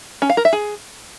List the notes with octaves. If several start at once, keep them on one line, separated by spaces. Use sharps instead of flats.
C#4
F5
A#4
E5
G#4